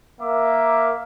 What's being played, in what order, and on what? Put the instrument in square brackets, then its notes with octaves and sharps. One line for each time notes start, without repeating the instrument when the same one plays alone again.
[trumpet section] A#3 A#4 E5 D6